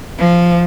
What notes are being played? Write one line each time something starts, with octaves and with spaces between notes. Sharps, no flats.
F3